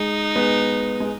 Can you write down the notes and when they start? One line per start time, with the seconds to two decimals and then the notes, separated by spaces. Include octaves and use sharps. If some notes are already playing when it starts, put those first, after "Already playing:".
Already playing: G#3 D#4
0.36 G#3 B3
1.00 G#3